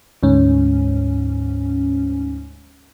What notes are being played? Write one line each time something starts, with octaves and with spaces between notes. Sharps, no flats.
D2 G#2 C#4